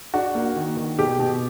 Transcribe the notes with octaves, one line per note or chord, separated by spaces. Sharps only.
D4 F#4
A#3
D#3
D#3
B2 G4
B2